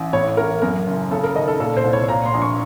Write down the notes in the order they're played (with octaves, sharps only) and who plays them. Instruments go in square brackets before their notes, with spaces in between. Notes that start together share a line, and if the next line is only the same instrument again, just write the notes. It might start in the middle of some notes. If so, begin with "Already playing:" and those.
Already playing: [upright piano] A1
A2 C#5
A1 A#4
F#2 A#4
F#1
C#3 A4
A#4
D#2 D#5
A4
A#2 A4
C5
C2
C#5
A#2 A#5
C6
A#1
C#6